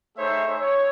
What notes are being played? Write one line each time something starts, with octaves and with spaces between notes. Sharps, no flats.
A3 D#4 G#4 C5 C#5 E5
C#5